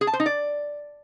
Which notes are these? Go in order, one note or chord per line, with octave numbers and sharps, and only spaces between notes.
G#4
A5
C5
D#4
D5